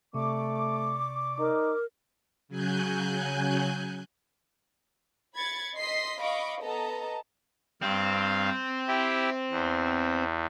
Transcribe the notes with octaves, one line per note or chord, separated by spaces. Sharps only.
C3 A3 D5 C#6 D6
D#4 A#4
C#3 F#3 G#5 F#6 G6
B5 G#6 A6 C#7
D#5 C6 B6 C7
D#5 F5 B5 C#6 D6
B3 A4 D#5 A5 A#5
G2 C4 F5
E4 G4
E2